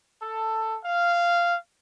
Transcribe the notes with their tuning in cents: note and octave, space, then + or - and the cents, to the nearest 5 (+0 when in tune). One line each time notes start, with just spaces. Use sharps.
A4 +10
F5 -10